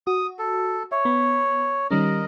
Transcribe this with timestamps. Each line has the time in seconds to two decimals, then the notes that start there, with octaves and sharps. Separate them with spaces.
0.07 F#4 D#6
0.39 A4
0.92 C#5 E5
1.05 B3 B5
1.91 D#3 G3 C#4 A#4 D#5